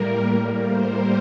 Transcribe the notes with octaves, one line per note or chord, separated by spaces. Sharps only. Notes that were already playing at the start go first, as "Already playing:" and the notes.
Already playing: A2 G3 A#3 A#4
A#4
C5